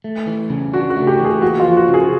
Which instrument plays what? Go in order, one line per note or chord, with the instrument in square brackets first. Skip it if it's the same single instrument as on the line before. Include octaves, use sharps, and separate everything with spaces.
[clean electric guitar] A3
E3
C#3
[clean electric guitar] D4 [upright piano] F#4
[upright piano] F#4
[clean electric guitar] A3
[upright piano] G4
[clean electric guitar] E3
[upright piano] G#4
[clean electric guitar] A#3 [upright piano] F#4
[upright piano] F4
[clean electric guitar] F3
[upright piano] F#4
[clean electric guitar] C#3
[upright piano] G#4